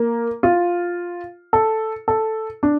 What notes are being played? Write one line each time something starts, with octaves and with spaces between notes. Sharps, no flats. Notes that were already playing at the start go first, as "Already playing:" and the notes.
Already playing: A#3
F4
A4
A4
D4